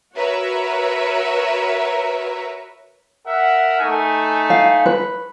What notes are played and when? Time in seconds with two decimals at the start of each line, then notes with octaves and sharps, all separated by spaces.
0.15 F#4 A#4 B4 C#5 E5
3.27 A#4 E5 F#5
3.81 A3 D#4 G#5
4.50 F5
4.86 B4